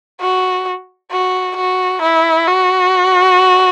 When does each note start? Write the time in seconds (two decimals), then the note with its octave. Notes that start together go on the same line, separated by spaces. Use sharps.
0.21 F#4
1.12 F#4
1.57 F#4
2.02 E4
2.48 F#4